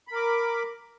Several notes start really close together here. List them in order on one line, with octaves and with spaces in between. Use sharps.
B5 A#4 D6